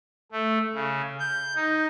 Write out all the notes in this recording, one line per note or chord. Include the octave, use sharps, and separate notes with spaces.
A3
C#3
G6
D#4